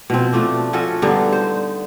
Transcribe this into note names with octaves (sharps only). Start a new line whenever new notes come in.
B2 F3 C4
F3 A3 D4
F3 C#4 F#4 A4
G2 D3 B3 D#4
C5